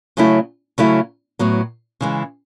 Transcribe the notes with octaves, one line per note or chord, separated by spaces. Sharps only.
C#3 F#3 A3 C#4 E4
C#3 F#3 A3 C#4 E4
A2 F#3 B3
C#3 E3 G#3